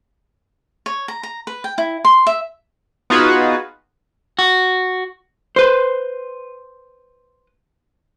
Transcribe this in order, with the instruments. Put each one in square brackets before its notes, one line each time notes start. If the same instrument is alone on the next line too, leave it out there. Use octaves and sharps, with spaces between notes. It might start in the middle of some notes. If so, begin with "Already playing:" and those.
[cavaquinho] C#5
A#5
A#5
B4
G5
E4
C6
E5
[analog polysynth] B3 D#4 F4 F#4 G#4 B4
[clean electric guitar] F#4
[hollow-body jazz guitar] B4 C5